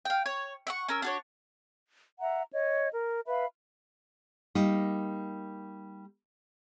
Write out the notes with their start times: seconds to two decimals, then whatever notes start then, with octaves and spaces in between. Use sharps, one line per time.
0.05 F5 G5
0.26 C#5
0.67 E5 F#5 C#6
0.88 C#4 A#4 E6
1.02 D4 F#4 C#5
2.21 E5 F#5 A#5
2.53 C#5 D#5
2.92 A#4
3.27 B4 E5 F5 B5
4.55 G3 A#3 D#4